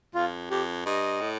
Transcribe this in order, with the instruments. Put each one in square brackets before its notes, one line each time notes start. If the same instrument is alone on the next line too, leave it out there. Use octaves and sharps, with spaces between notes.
[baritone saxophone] F2 [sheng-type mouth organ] F4
[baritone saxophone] F2 [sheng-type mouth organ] G4
[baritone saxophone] G2 [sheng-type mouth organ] D#5
[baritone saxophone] A2